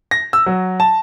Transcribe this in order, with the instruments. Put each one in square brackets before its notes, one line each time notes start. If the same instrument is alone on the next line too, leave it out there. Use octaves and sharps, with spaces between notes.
[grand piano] A#6
E6
F#3
A5